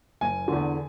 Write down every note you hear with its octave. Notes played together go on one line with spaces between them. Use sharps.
F#1 G#5
E2 D3